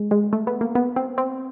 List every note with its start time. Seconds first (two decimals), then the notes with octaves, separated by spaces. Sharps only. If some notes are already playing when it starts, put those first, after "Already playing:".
Already playing: G#3
0.11 G#3
0.33 A3
0.47 B3
0.61 A#3
0.75 B3
0.96 C4
1.18 C4